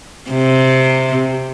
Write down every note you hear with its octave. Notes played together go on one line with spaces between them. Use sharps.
C3